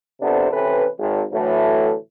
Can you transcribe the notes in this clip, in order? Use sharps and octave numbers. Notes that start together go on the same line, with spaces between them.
F2 C3 B3 D4 A4 C5
C3 E3 C#4 A4 B4
G#1
A2 D3 E3 F#3 A3